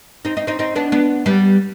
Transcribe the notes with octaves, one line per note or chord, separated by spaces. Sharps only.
C4 D#4
C4 D#4
C4 D#4
C4 D#4
B3 D4
B3 D4
G3 B3